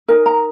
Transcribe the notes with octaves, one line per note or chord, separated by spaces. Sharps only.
D#4 A#4 G#5
A#5